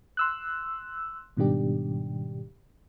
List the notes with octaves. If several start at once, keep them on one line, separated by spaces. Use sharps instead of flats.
C6 E6 F#6
G#2 B2 D#3 G3 D4 G4